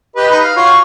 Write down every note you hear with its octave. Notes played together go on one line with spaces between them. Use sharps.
G4 B4 D#5
D#4 B4
F5
F4 F#4 C#5